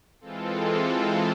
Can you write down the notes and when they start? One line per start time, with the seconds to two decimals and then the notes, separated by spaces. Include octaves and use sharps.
0.21 E3 G#3 C4 F4 A4